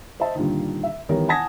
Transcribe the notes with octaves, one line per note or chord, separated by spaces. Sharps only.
C5 D#5 E5 A5
G2 A#2 D3 D#3
E5
D#3 E3 G3 B3 A#4 C#5
F#5 G#5 A5 D#6 G#6 A#6